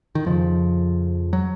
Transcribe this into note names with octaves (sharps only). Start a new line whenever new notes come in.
D#3
F2 C#3 F3
F#3